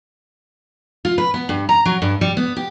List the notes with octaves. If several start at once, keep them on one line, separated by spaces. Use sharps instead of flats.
F4
B4
B3
G2
A#5
F#3
G2
G3
B3
G4